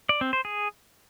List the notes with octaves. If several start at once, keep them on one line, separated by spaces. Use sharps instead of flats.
D5
C4
C5
G#4